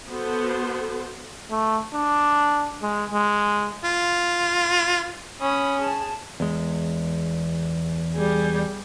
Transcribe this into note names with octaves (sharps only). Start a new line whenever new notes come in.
B3 F#4 A4 C5
A3
D4
G#3
G#3
F4
C#4 B5 D#6
G#4 A5
E2 G#3
G3 G#4